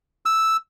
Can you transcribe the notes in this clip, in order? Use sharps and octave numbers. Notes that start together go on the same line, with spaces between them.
E6